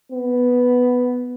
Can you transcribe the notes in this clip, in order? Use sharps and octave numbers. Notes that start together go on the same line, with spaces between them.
B3